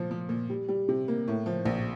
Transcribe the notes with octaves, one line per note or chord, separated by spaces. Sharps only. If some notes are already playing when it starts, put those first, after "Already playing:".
Already playing: A#2 F3
F3
A#2
G3
G3
C3
A#3
A2
F3
A#1